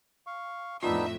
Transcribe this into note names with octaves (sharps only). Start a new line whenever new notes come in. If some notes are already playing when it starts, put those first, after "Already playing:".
F5 C#6
F2 A2 B3 D4 D#4 F4 E5